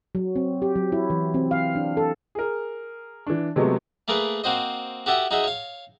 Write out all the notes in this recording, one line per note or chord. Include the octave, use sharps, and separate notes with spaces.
F#3
C4
G4
F#3
E4
E3
C4
F5
D4
A4
G#4 A#4
E3 D4
C3 F#3 G#3 A3 B3
A3 A#3 G#4 A#4 B4
A#3 C4 F#4 C5 D#5
F#4 G4 A4 E5 F#5 D#6
D#4 F#4 G#4 D#5 E5
C#5 F5